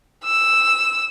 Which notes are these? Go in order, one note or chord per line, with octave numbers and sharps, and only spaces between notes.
E6